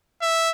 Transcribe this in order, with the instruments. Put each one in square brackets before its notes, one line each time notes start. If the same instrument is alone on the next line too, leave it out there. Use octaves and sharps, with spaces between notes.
[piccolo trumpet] E5